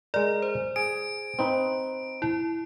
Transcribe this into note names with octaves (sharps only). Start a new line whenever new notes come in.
G#3 A#4 D5
C5
G#4 D7
C4 D#4 B4
E4